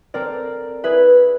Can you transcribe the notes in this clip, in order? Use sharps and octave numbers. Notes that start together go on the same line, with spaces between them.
C4 A4 A#4 D5
E4 G#4 B4 E5